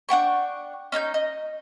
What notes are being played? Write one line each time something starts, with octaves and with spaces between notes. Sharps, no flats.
D4 F#5 G5 C#6
C#4 D#4 E6 G6
D#5